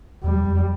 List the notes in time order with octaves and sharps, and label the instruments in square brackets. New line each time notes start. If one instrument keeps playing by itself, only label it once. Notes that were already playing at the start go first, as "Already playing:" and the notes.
[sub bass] E2 [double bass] G3
[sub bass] F2